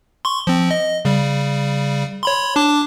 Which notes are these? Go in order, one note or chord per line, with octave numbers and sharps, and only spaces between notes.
C6 C#6
F3 C4
D#5
C#3 G3
C#5 B5 C6
D4 A5 D6